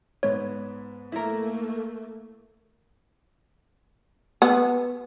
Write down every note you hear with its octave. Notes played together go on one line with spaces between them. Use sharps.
G#2 B3 C#5
A3 A#3 E4 A#4
B3